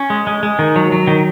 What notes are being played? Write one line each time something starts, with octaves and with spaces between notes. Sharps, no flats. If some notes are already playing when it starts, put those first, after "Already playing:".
Already playing: C#4
G#3
G#3
G#3
D#3
F#3
F#3
D#3